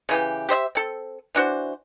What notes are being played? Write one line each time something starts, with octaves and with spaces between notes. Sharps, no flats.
C#3 E3 G4
G4 C5 D#5 E5
C4 A4
E3 D4 F#4 C5